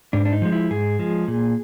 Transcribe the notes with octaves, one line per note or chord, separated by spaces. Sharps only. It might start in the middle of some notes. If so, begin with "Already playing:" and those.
G#2 D4
D4
D#4
F3 G#3
E4
G#2 G#4
F3 G#3
A#2